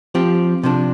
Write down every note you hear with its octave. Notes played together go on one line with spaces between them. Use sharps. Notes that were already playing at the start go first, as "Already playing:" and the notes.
F3 C4 G4
C3 F3 D4